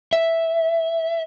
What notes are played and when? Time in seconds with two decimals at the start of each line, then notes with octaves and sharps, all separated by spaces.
0.13 E5